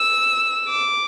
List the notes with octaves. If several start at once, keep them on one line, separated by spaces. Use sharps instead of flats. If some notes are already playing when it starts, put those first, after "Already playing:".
Already playing: E6
D6